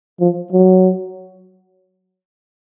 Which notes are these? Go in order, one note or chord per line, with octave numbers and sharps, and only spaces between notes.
F3
F#3